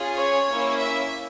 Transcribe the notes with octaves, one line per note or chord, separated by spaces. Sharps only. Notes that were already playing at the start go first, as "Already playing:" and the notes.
Already playing: C#4 F4 G#4
C#5
A#3 C#4 E4
E5